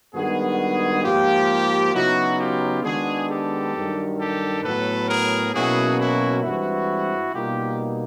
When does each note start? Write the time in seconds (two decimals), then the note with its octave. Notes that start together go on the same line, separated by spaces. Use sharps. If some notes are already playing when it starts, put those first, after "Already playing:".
0.14 G2 D#3 G#3 B3 F#4 G#4
1.04 G#2 F3 A#3 F4 G4
1.94 C#3 F#3 B3 D#4 E4 F#4
2.39 F4 G4
2.84 D#3 G#3 B3 D4 F#4 G#4
3.29 G4 A4
3.74 G2 D#3 F#3
4.19 G4 A4
4.64 A2 F#3 B3 A4 B4
5.09 G#4 A#4
5.54 B2 F#3 A#3 C#4 E4 F#4 G#4
5.99 E4 F#4
6.44 G2 E3 G#3 C4 E4 F#4
7.34 B2 G3 A#3 D#4 F4 G4